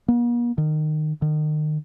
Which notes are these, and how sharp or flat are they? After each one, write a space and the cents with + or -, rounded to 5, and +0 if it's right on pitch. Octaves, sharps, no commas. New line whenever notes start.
A#3 +45
D#3 -20
D#3 -35